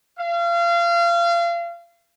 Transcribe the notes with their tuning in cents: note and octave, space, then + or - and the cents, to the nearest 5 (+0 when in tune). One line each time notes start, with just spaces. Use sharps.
F5 -30